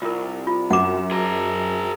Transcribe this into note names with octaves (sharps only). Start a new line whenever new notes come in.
C2 F4 A#4
F4
F#2 F#5 D6 E7
G#4 A#4